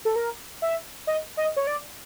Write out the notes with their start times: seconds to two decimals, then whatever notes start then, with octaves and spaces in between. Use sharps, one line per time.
0.05 A4
0.16 A#4
0.62 E5
1.07 D#5
1.37 D#5
1.57 C#5
1.67 D5